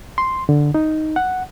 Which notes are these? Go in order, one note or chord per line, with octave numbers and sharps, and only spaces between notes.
C6
D3
D#4
F#5